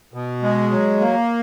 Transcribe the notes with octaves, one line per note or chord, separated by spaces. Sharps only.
B2
G#3
F#3
A#3